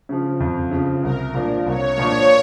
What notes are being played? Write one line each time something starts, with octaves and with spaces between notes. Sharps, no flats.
C#3 F3
F2
C#3 F3
C2 A#4
A#2 F3 A#3 D4
C2 C#5
A#2 F3 A#3 D4